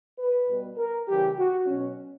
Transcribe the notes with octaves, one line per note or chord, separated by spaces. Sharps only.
B4
B2 G3
A#4
C#3 E3 G3 G4
F#4
B2 F#3 C#4